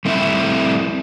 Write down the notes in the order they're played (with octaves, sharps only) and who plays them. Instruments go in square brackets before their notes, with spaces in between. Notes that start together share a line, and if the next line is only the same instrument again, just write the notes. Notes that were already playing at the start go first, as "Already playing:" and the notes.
[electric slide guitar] G3 A3 C4 E4 C#5 E5